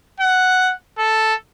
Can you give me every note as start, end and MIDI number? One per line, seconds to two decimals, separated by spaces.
0.20 0.73 78
0.98 1.34 69